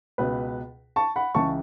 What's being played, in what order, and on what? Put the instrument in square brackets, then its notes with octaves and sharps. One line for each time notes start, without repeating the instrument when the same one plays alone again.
[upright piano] C#2 B2 B4
A5 C#6
F#5 B5
C#2 C#3 E3 A5 C#6